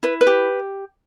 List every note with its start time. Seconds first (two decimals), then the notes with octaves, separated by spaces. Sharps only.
0.03 E4 B4
0.21 B4
0.27 G4